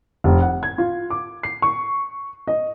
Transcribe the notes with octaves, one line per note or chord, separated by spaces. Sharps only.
F1
F#5
G#6
F4
D6
C7
C#6
D#5